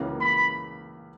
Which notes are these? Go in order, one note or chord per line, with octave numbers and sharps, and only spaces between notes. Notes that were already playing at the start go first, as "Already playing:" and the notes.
Already playing: C#2 C#3 E3 A#3
B5